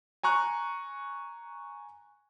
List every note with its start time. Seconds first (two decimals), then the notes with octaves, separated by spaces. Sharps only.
0.23 G#5 A#5 C#6 F#6